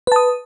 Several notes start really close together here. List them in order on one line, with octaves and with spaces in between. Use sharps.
B4 A5 D#6